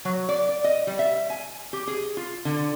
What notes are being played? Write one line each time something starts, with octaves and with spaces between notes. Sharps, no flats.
F#3
D5
D5
D#5
G3
E5
G#5
G4
G#4
F4
D3